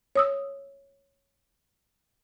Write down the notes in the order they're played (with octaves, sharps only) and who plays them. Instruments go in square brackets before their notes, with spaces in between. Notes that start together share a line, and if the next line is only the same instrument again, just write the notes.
[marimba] C#5 D#6 E6